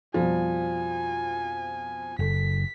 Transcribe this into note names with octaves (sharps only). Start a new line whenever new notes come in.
F2 B2 F3 G3 G#5
F#1 A4 B6